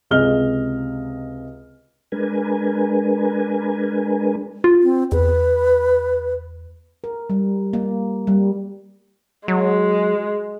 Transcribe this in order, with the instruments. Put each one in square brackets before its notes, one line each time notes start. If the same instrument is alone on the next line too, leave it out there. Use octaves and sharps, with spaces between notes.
[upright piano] C#2 C3 G#4 D#5 F6 G7
[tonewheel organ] G#3 D4 A#4 B4 G#5
[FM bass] F4
[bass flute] C4
[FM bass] E2 [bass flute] B4
[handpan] A#4
G3
A#3
G3
[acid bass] F#3 [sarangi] G#3